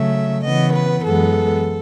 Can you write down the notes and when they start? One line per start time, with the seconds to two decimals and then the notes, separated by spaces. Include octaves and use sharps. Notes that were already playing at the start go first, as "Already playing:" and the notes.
Already playing: C#3 F#3 A3 E5
0.44 C#3 E3 B3 D#5
0.73 B4
1.03 F#2 E3 G#3 B3 A4